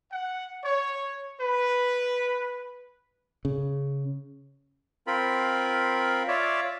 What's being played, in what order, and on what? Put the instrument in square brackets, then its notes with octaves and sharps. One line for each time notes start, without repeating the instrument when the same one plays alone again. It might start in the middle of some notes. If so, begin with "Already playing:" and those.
[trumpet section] F#5
C#5
B4
[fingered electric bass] C#3
[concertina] C4 F4 A#4 B5
F4 C#5 D5 E5